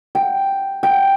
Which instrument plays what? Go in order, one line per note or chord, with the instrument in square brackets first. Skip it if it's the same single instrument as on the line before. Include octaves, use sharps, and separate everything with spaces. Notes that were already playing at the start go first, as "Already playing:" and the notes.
[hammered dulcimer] G5
G5